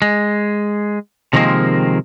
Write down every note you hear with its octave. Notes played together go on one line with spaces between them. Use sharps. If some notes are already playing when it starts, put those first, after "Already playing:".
G#3
C3 D#3 F3 G#3 A#3 C4